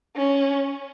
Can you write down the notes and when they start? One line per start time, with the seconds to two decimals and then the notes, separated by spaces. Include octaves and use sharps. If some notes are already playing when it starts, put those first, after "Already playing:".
0.16 C#4